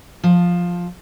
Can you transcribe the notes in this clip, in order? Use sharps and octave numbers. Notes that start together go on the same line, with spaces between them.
F3